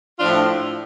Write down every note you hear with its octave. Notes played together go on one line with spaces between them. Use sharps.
A2 F3 D4 F4